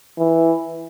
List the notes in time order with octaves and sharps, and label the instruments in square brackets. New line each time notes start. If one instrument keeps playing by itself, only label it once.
[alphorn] E3